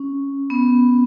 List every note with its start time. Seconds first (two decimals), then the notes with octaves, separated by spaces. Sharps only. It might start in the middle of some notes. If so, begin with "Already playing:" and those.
Already playing: C#4
0.50 B3